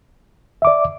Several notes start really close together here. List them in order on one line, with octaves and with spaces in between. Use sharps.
E5 D6 D5